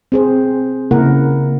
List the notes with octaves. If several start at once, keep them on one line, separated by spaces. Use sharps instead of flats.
C4 G#4 C5
C#3 A#3 E4 A#4 F#5